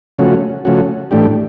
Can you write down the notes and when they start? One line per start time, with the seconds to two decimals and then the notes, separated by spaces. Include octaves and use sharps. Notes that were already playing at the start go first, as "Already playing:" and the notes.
0.19 C#3 F3 A3 C#4 F#4
0.65 C#3 F3 A3 C#4 F#4
1.11 A2 E3 A3 D4 G4